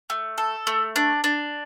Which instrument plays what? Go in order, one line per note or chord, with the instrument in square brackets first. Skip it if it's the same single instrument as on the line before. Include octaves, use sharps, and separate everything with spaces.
[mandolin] A3
A4
A3
D4
D4